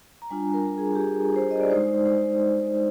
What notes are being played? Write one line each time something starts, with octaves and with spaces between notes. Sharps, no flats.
A#5
G3 D4 F4 G#5
A#4
G#4
G4
G#4
C5
D#5
D5
G#3 D#4 C5
C5